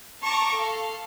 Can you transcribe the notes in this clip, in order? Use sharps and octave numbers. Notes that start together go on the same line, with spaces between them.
A5 A#5 C#6 D6 A#6
A4 F5